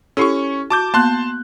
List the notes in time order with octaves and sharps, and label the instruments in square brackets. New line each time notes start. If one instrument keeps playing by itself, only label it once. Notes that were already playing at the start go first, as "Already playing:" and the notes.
[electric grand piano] C#4 C#6 [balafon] E4 G4 A4
[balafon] F#4 [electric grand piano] A5 D6 G6
[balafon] A#3 B3 [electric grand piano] A5 C6 F#6